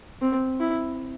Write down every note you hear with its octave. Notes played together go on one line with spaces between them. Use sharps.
C4
E4